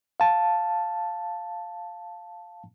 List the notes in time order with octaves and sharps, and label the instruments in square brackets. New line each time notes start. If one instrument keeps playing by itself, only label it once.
[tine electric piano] F5 A5